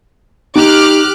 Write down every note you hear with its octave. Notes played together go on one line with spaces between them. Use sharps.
D#4 G4 D6 F6 F#6